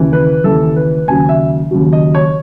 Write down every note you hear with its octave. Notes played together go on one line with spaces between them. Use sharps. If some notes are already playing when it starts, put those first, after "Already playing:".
Already playing: D#2 C#3 E3
B4
D#2 C#3 E3 A4
B4
D#2 C#3 F#3 G#5
E5
D#2 C#3 F#3
D#5
C#5